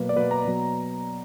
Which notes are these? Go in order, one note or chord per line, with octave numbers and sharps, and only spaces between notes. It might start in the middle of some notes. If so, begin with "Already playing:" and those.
Already playing: B2 F#3 A#3 B4
D5
B2 F#3 A#3 B4
A#5
B2 F#3 B3